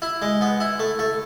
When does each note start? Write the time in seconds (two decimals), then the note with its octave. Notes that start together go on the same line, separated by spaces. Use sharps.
0.02 E4
0.22 G#3
0.41 B3
0.60 E4
0.79 A3
0.99 A3